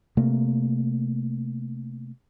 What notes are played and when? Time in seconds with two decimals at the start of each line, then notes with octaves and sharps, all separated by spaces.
0.17 C3 A3 A#3